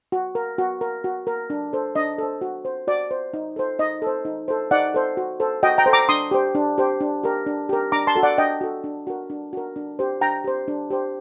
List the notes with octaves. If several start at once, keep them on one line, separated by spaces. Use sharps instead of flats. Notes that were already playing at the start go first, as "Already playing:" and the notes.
F#4
A#4
F#4
A#4
F#4
A#4
D4
A4 C5
D4 D#5
A4 C5
F#4
C5
F#4 D5
C5
D#4
A4 C5
D#4 D#5
A4 C5
D#4
A4 C5
D#4 D5 F#5
A4 C5
F#4
A4 C5
F#4 D#5 G5
G5 A#5
A4 C5
A#5 D6
D4 C6 D#6
G4 C5
D4
G4 C5
D4
G4 A#4
D4
G4 A#4
D4 A#5 D6
A5 C6
F#4 A4
D5 F#5
D4 D#5 G5
F#4 A4
D4
F#4 A#4
D4
F#4 A#4
D4
G4 C5
D4 G5 A#5
G4 C5
D4
G4 C5